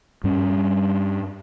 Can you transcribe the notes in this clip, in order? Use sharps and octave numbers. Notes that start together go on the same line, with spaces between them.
G2 G3 C#4